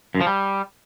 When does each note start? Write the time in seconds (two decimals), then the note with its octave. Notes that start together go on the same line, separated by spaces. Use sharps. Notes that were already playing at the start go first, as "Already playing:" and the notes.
0.15 F#2
0.21 F3
0.27 G3